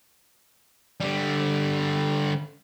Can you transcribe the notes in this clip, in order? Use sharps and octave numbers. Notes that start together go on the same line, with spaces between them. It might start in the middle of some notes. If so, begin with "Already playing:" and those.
D3 G3